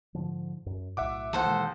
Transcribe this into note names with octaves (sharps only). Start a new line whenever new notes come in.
G#2 D3 F3
F#2
B1 A2 E5 F#5 D6
D#2 E3 A4 C5 F#5
B2 E3 G#3